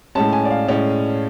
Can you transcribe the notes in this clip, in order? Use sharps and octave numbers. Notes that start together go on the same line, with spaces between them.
A2 G#3 C#4 A5
G#5
D5
F5
A2 G#3 C#4 D5